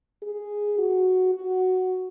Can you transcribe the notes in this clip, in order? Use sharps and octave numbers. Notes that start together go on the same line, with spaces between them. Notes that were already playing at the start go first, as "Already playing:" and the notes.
G#4
F#4
F#4